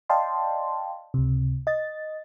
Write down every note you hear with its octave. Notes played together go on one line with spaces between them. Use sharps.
D5 D#5 F5 G5 A5 C6
C#2 C3
D#5 A6